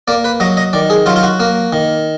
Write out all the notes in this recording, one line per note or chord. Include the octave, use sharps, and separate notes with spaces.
A#3 D5
B4
F#3 D#5
D#5
D#3 D5
G#4
F#3 F4
F4
F#4
A#3
D#3